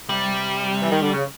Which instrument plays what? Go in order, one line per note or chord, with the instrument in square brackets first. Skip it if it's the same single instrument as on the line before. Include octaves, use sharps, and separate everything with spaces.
[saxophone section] C3 [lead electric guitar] G3
[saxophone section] E3
D#3
D3
C#3